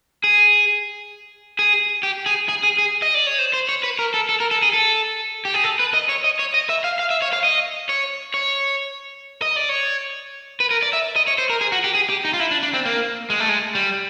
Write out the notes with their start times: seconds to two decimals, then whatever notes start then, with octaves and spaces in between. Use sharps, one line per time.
0.24 G#4
1.59 G#4
2.03 G4
2.26 G#4
2.49 G#4
2.63 G#4
2.78 G#4
3.02 D#5
3.14 D5
3.27 C#5
3.39 C5
3.53 C5
3.69 C#5
3.83 B4
3.99 A#4
4.14 A4
4.29 A4
4.40 A#4
4.51 A4
4.63 G#4
4.73 A4
5.45 G4
5.54 G#4
5.64 A4
5.79 B4
5.94 D#5
6.09 C#5
6.24 D#5
6.39 C#5
6.54 D#5
6.69 E5
6.84 F5
6.99 F5
7.11 E5
7.22 C#5
7.33 F5
7.44 D#5
7.89 C#5
8.34 C#5
9.42 D#5
9.56 D5
9.69 C#5
10.60 B4
10.71 A#4
10.82 D5
10.93 E5
11.16 D#5
11.27 C#5
11.38 C5
11.50 A#4
11.61 G#4
11.72 F#4
11.84 G4
11.95 G#4
12.10 G4
12.25 D#4
12.34 F4
12.40 E4
12.51 D4
12.63 D4
12.74 C4
12.85 A#3
13.30 G#3
13.40 A3
13.49 G#3
13.75 G3